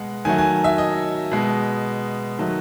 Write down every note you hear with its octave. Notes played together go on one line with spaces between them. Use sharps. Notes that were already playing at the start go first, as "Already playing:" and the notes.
Already playing: B2 G#3 F#5
D#3 F#3 A3 G#5
G#5
E5
D#5
B2 G#3
D#3 F#3 A3